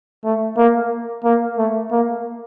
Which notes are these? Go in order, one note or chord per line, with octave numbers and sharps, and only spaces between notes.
A3
A#3
A#3
A3
A#3